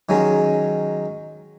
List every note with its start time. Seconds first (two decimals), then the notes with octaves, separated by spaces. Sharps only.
0.09 D#3 F#3 G#3 C#4